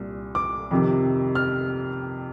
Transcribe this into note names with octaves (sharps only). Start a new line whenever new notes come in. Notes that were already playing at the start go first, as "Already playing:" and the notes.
Already playing: C2 A#2
D6
F2 C3 D#3
F6